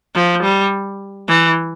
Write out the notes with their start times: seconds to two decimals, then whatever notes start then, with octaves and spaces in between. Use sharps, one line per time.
0.15 F3
0.43 G3
1.28 E3